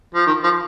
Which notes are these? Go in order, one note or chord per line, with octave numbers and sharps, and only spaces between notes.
F3
D#3
F3